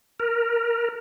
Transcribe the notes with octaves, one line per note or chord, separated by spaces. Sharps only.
A#4